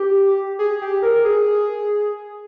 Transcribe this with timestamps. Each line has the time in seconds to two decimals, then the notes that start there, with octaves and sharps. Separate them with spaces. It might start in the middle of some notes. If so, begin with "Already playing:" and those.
Already playing: G4
0.59 G#4
0.82 G4
1.03 A#4
1.24 G#4